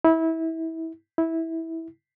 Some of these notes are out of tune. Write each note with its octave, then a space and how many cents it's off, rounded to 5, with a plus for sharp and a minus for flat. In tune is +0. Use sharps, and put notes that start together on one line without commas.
E4 -25
E4 -15